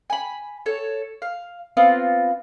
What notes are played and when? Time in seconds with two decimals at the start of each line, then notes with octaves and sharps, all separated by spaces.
0.10 G#5 B5
0.66 A4 C#5
1.22 F5
1.77 B3 C4 F4